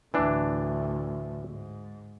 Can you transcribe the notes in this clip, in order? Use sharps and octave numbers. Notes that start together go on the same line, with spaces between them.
D2 A2 E3 D4
G#2